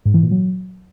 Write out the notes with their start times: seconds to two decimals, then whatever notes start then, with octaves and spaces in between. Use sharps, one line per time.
0.05 G#2
0.14 E3
0.23 A#2
0.31 F#3